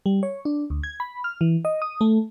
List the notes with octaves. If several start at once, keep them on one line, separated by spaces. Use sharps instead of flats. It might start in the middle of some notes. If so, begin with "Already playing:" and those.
G3
C#5
D4
D2
G#6
B5
F6
E3
D#5
D#6
A3